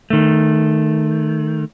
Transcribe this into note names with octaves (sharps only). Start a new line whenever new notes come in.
D#3 A3